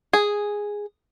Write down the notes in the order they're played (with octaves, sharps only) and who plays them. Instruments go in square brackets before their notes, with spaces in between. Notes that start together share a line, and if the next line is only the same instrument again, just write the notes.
[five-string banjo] G#4